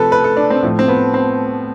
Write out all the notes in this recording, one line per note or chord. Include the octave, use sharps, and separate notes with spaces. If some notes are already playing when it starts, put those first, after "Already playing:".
Already playing: C3 F3 A3 A4 B4
B4
A4
D4
C4
A2 F3 A3
C4
B3
C4